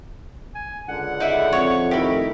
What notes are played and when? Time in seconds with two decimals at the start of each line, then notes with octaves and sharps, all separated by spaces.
0.55 G#5
0.88 C#2 D3 F#5
1.20 D#4 E4
1.53 F2 C#5
1.91 D#3 A3 E4 G4 A#4 B5